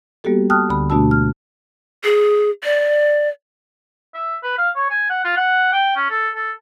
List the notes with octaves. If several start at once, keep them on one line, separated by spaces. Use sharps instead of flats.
G3 A#3 B3 F#4 G4 A4
G5 A5 D#6 F6 F#6
D2 D3 B5
B2 A3 D4 F#4 A5 E6
F6
G#4
D5
E5
B4
F5
C#5
G#5
F#5
F4
F#5
G5
C#4
A4
A4